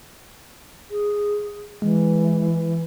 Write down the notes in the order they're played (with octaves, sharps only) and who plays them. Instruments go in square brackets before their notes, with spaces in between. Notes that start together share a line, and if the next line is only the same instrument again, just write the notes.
[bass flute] G#4
[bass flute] E3 [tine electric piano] G#3